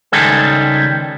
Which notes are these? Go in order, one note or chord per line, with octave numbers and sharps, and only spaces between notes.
C#2 D#3 G3 G#3 G#4 A4